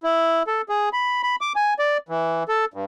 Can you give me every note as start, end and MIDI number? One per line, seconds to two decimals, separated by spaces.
0.03 0.43 64
0.47 0.62 69
0.69 0.89 68
0.93 1.22 83
1.23 1.36 83
1.41 1.53 86
1.56 1.74 80
1.79 1.98 74
2.09 2.43 52
2.49 2.65 69
2.74 2.85 43